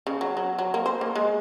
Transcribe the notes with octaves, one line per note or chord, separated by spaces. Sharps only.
C#3
F#3
F#3
F#3
A#3
C5
A#3
G#3